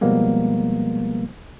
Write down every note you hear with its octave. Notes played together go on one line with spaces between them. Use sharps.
B2 F3 G3 G#3 A#3 B3